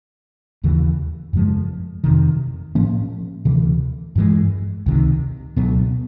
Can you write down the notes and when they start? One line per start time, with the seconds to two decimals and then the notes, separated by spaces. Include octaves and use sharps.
0.63 D#2 C#3 E3
1.33 F#2 C#3 F3 G#3
2.04 F2 C3 D#3
2.75 A2 F3 A#3 C#4
3.45 D2 C3 E3
4.16 G2 E3 G#3
4.86 C#2 C3 D#3
5.56 C#2 B2 F#3 B3